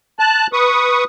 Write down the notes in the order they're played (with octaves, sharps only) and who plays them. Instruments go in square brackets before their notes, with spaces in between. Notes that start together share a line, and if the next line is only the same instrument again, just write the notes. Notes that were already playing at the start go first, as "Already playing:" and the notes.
[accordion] A5 F#6
B4 C#6 D#6